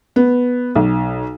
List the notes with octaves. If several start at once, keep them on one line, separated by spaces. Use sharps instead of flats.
B3
B1